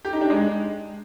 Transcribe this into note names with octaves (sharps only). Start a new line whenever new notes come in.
G4
D#4
D4
G#3